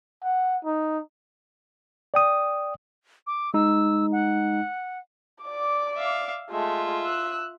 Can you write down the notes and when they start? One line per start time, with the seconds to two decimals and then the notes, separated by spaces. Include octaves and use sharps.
0.23 F#5
0.65 D#4
2.14 D5 G5 D#6
3.27 D6
3.54 G#3 D#4 E6
4.12 F#5
5.44 D5 D6
5.97 E5 F5
6.50 G#3 A3 F4 E5
7.05 E6 F#6